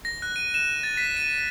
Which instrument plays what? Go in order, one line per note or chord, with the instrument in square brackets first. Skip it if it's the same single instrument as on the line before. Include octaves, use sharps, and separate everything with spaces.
[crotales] A#6
F#6
D#7
E7
A6
B6
D#7